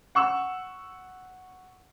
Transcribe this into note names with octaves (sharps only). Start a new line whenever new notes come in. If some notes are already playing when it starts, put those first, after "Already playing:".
F#5 C#6 E6